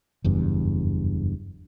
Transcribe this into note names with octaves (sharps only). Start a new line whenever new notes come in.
F#1 E2 G2